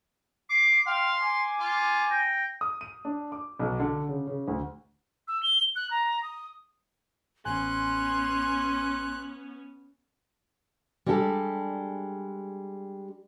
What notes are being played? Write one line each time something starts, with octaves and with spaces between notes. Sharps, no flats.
D6 C7
F5 G5 C6
G#5 D6
F4
G5 A#6
D#6
D#7
D4
D6
B1
D3
C#3
C#3
D2
E6
G7
F#6
A#5
D#6
A1 B3 C#4 G#5 C6 F#6
G3 G#3 D4 G4 A4